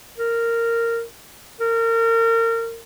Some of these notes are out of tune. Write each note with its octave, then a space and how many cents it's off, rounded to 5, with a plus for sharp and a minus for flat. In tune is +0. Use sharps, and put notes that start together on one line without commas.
A#4 -10
A#4 -30